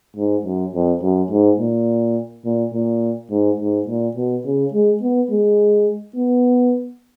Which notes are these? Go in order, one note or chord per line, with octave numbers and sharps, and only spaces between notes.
G#2
F#2
F2
F#2
G#2
A#2
A#2
A#2
G#2
G#2
A#2
B2
C#3
G#3
B3
G#3
B3